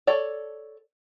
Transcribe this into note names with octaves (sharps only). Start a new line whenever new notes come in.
A4 C#5 D5